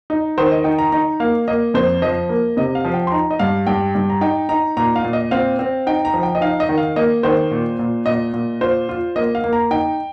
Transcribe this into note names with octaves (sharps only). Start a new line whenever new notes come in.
D#4
D#3 C5
D#5
D#4 G5
A#5
D#4 A#5
A#3 F5
A#3 D#5
F2 C5
F3 D#5
A#3
C3 D#5
F5
F3
G5
C6
D#4 A#5
D#5
G2 F5
G2 G5
G2
A#5
D#4 G5
D#4 A#5
A#2 A#5
F5
A#2
D#5
C4 F5
C4
D#4 G5
A#5
F3
G5
D#5
D#4 F5
D#5
D#3
F5
A#3 D#5
D#3 C5
A#2
A#2
A#2 D#5
A#2
F4 C5
F4
A#3 D#5
F5
A#3
A#5
D#4 G5